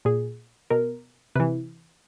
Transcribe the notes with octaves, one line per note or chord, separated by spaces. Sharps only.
A#2 G#4
B2 A#4
C3 E3 B4